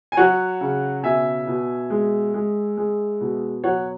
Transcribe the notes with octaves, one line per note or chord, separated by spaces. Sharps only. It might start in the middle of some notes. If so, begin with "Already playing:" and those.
G#5
F#3 C#5 F#5
C#3
B2 E5 G#5
B2
G#3
G#3
G#3
B2
F#3 C#5 F#5